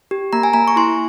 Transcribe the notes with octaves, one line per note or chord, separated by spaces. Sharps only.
G4
A#3 A#5
G#5
A#3 A#5
C#6
E4 C6